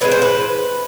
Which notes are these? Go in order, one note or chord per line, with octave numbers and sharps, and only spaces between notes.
A2 E3 G#3 C4 B4
C5
B4